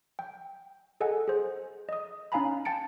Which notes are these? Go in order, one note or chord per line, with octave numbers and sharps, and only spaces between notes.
G5
G#4 A4 D#5 F#5 G#5
G#4 C5
D#5 D#6
C#4 D#4 F5 G#5 A#5 B5
G5 A5 A6 C#7 D7